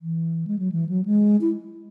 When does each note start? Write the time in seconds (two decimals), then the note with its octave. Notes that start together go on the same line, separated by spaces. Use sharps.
0.02 E3
0.47 G#3
0.59 F#3
0.72 E3
0.89 F#3
1.05 G#3
1.41 E4